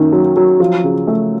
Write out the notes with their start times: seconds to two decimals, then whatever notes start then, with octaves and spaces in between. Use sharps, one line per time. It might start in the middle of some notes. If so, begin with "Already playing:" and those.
Already playing: F#2 D#3 A#3
0.12 F#3
0.37 F#3
0.60 F3
0.84 C#3
1.07 A3